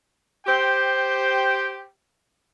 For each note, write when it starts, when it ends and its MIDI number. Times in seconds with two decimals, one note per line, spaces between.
0.46 1.84 67
0.46 1.84 72
0.46 1.84 79